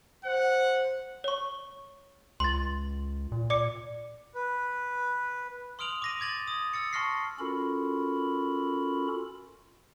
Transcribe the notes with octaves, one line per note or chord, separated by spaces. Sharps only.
C5 F#5
C#5 C#6
C#2 C6 A6
A#2
D5 D6 C#7
B4
C6 D#6 F6 D7 F7 F#7
D6 A#6 D#7
D6 G#6 A6 F#7
D#6
E6 A6 C#7
A5 C6 C#6 F6 A#6 C7
C#4 F4 F#4 A4 A#4 B5